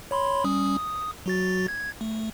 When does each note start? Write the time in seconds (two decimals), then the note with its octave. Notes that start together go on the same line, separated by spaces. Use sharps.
0.11 C#5 B5 C6
0.44 G3 C#4 D#6
0.77 D#6
1.26 F#3 F#4 A6
1.68 G#6
2.01 A3